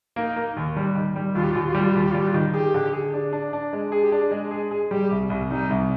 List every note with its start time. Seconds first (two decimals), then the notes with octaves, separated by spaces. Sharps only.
0.16 A#3 D#4
0.36 A#3
0.57 D#2
0.76 G3
0.95 D#3
1.16 G3
1.35 D#2 F4
1.44 G4
1.51 F4
1.56 D#2 G4
1.65 F4
1.73 G3 G4
1.81 F4
1.89 G4
1.95 D#2 F4
2.04 G4
2.11 F4
2.14 G3
2.19 G4
2.28 F4
2.34 D#3
2.53 G4 G#4
2.74 D3
2.93 G#4
3.14 D4
3.33 D4
3.53 D4
3.73 G#3
3.92 G#4
4.02 G4
4.12 D4
4.31 G#3
4.51 G#4
4.71 G#4
4.90 G3 G4
5.11 C2
5.30 C2
5.50 G3 D#4
5.70 C2